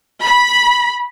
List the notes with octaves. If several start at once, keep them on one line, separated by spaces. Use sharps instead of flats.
B5